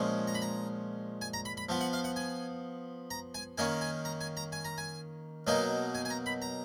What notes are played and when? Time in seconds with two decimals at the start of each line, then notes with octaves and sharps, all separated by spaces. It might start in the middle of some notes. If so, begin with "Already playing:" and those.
Already playing: A#2 F3 G#3 C#4
0.27 A#5
0.35 B5
0.42 A#5
1.21 G#5
1.34 A#5
1.45 B5
1.57 B5
1.69 F3 B3 F4
1.81 F#5
1.93 F5
2.04 F#5
2.16 G#5
3.11 A#5
3.34 G#5
3.58 D#3 A#3 C#4 G#5
3.81 G#5
4.05 A#5
4.21 G#5
4.37 A#5
4.52 G#5
4.65 A#5
4.78 G#5
5.47 B2 F#3 A#3 D#4 G#5
5.95 G#5
6.05 G#5
6.10 A#5
6.26 B5
6.42 A#5